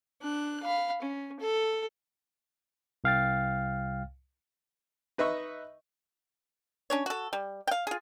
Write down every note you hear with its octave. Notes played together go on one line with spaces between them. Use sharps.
D4 F#6
F5 B5
C#4
A4
C2 F5 G5 A6
D#4 B4 D#5 E5 C#6
C#4 D4 C#5
F#4 A4
G3
F5 G5
F4 G#4